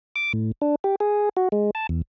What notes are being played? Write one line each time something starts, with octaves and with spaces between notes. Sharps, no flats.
D6
A2
D4
G4
G#4
F#4
G#3
A5
E2